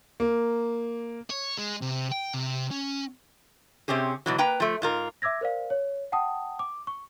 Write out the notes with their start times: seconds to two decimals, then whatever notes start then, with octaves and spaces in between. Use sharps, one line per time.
0.20 A#3
1.30 C#5
1.58 G#3
1.82 C3
2.12 G5
2.34 C3
2.71 C#4
3.88 C3 C4 C#4 G4 G#4
4.26 B2 E3 F#3
4.38 A#3 B4 G5 A#5
4.60 F3 A3
4.82 G#2 F4 A#4
5.22 E5 D6 E6 G#6 A#6
5.41 A#4 C5 D5 F5
5.70 C#5
6.12 F#5 G5 A5 D#6
6.59 D6
6.87 C#6